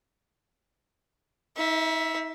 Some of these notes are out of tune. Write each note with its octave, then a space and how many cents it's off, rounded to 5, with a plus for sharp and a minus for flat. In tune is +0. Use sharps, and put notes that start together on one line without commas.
D#4 +45 E5 +0